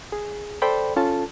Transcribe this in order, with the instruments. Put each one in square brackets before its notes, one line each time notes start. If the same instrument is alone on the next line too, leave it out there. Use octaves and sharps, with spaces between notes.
[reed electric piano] G#4
A4 C5 D5 G5 B5
C#4 F4 A4 A5